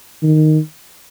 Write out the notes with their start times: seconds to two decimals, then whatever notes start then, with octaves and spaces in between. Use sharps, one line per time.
0.23 D#3